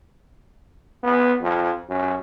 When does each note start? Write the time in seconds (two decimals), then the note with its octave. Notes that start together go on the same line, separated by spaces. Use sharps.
1.03 B3
1.41 F2
1.89 F#2